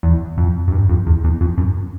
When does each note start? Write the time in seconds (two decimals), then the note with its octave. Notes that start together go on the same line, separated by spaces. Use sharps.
0.03 E2
0.38 F2
0.68 F#2
0.72 G2
0.89 F2
1.07 E2
1.24 E2
1.41 F2
1.58 F#2